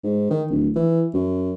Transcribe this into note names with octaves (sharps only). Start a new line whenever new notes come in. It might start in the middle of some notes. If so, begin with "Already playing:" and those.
G#2
D#3
D1
E3
F#2